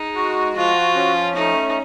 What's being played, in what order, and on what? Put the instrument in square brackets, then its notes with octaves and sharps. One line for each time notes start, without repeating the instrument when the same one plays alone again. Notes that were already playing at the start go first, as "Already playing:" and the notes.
Already playing: [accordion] G#3 [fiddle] D#4
[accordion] F#4
[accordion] F3 [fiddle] F4
[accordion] C#4
[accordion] A3 [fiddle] D#4